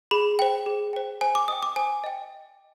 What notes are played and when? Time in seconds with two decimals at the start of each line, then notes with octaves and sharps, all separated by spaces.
0.11 G#4 B5
0.39 C5 G5
0.66 G#4
0.93 C5 G5
1.21 C5 G#5
1.35 D6
1.48 D#5 G5 D#6
1.63 D6
1.76 C5 G#5
2.04 D#5 G5